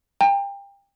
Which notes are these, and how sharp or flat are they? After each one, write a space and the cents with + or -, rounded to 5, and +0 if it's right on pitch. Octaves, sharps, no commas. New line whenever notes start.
G5 +30 A#5 -45